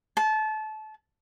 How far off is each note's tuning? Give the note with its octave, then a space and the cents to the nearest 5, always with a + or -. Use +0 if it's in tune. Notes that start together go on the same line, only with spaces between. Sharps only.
A5 -25